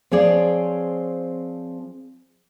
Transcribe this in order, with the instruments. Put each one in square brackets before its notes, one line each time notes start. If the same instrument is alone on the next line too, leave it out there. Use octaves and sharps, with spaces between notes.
[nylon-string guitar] F3 C4 G#4 C#5 D5